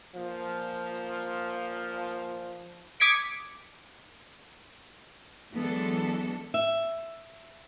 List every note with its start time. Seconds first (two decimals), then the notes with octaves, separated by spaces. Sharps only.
0.15 A#2 F3
3.00 D6 D#6 G#6 B6 C#7 D7
5.53 E3 F#3 G#3 B3 D4 A4
6.54 E5